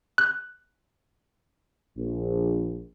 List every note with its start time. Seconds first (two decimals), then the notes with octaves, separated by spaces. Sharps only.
0.18 F#6
1.98 A#1